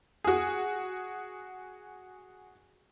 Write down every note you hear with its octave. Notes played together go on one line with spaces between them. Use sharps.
F#4 G#4